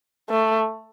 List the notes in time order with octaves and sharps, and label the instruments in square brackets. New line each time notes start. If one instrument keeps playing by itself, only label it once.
[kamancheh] A3